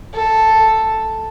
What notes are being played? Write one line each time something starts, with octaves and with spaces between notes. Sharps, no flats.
A4